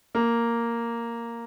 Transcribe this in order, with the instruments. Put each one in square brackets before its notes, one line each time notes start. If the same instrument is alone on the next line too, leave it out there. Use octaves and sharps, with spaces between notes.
[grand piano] A#3